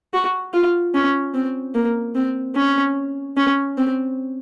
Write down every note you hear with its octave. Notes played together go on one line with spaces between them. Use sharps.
F#4
F4
C#4
C4
A#3
C4
C#4
C#4
C4